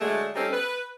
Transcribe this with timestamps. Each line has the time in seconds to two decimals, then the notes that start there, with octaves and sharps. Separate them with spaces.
0.01 D3 F#3 G#3 A3
0.35 G3 C4 C#4 D#4 G4 A4
0.52 B4